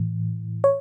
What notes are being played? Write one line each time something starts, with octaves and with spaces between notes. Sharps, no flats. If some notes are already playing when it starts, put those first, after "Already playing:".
Already playing: A2 E3
C#5